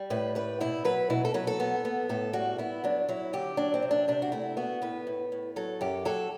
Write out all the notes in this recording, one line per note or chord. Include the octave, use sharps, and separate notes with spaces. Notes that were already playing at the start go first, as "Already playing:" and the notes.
Already playing: G3
A2 B4
G3 B4
B2 E4
F#3 B4
B2 E4
A4
F#3 B4
A4
B3
B3
A2 A4
G3 F#4
B3 E4
F#3 D4
F#3 E4
D3 G4
F#3 D4
C4
C3
D4
C3 D4
F#4
A3 E4
B3 F#4
A2 B4
A2
A2
F#3 A4
F#2 G4
F#3 A4